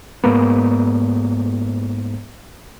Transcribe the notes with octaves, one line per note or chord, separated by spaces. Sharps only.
G#2 A#3 B3